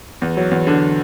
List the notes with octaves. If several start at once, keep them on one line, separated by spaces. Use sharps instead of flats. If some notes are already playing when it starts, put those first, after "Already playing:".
E2
F#3
E2
D3